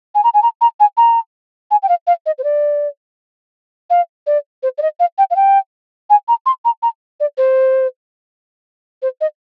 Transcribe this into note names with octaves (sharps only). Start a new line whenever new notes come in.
G#5
A#5
G#5
A#5
A#5
G#5
A#5
G#5
G5
F5
F5
D#5
C5
D5
F5
D5
C5
D5
D#5
F5
G5
F5
G5
G#5
A#5
C6
A#5
A#5
D5
C5
C5
D#5